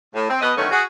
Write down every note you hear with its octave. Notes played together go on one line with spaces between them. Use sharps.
A2
C4
B2 B4 D#5
D3 D#3 F#3 A3 B3 C#4
F#4 G#4